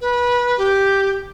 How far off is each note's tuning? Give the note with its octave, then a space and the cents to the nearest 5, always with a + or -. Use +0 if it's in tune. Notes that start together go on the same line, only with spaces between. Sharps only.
B4 -25
G4 +0